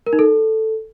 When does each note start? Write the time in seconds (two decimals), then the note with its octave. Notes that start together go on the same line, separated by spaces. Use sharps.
0.06 A#4
0.13 D#4
0.19 A4